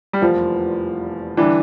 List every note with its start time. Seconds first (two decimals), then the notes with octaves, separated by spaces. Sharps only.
0.13 G3
0.22 F1 E2 E3 F3 A#3 F4
1.37 D3 E3 G3 D4